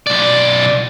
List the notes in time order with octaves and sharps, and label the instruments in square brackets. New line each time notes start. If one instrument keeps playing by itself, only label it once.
[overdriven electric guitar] B1 D5